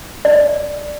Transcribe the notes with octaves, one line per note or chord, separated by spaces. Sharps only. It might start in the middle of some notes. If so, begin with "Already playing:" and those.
D5